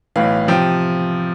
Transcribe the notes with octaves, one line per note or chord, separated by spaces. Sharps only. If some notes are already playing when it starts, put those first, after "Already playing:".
B1 A2 E3 F5
C3 F3 G5